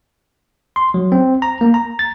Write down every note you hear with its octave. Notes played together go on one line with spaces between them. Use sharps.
C6
F#3
C4
A#5
A#3
A#5
A6